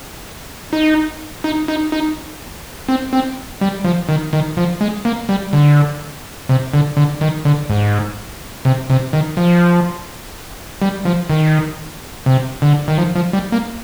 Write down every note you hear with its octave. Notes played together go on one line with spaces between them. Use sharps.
D#4
D#4
D#4
D#4
C4
C4
G3
F3
D#3
D#3
F3
G#3
A#3
G3
D3
C3
D3
D3
D#3
D3
G#2
C3
C3
D#3
F3
G3
F3
D#3
C3
D3
D#3
F3
F3
G3
A#3